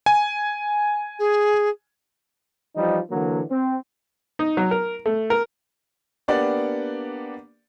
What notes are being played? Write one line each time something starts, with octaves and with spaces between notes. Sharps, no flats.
G#5
G#4
E3 F3 G3 D#4
D3 E3 F#3 A#3
C4
D#4
F#3
A#4
A3
A#4
A#3 B3 D4 G4 D5 F#5